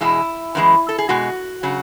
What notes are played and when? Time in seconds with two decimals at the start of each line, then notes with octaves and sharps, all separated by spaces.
0.01 E2 B2 G#3 E4
0.55 F#2 E3 G#3
0.89 A4
0.98 G#4
1.09 B2 G#3 F#4
1.63 C#3 F#3